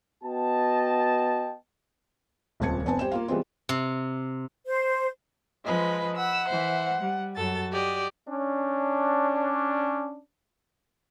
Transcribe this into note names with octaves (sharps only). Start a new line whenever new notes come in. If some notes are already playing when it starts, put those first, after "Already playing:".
B3 F#4 D#5 G5 A5
D#1 C#2 C4 A5 G#6 C#7
F1 B3 C4 G#5 A5
G3 C5 G5 E7
A#3 F4 F5
E3 G3 G#3 B3 C4 F4
C3
C5
F3 G#3 B4 D#5
F#5 B5 E6
E3 C5 E5
G3
F#2 F#4 A4 A6
G4 D5 D#5
C#4 D4